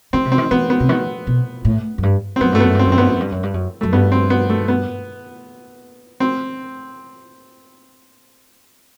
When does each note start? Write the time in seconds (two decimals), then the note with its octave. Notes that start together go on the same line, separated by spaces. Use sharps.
0.13 D#3 C4
0.25 C3
0.32 C4
0.38 D#3
0.51 E3 B3
0.70 B3
0.80 C3
0.89 D#3 B3
1.27 B2
1.65 A2
1.98 F#2
2.03 G2
2.36 C4
2.40 F#2 B3
2.52 G2 A3
2.60 F#2 B3
2.75 G2 C4
2.87 F#2
2.92 C4
2.98 G2 B3
3.09 F#2
3.20 G2
3.32 F#2
3.43 G2
3.54 F#2
3.81 F#2 A3
3.92 G2 B3
4.12 C4
4.30 B3
4.50 A3
4.68 B3
6.20 C4